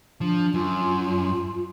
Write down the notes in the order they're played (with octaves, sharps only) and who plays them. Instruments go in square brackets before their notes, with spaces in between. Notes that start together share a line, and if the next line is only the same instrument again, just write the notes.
[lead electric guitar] F3 [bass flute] D4
[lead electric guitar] F#2 [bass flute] F4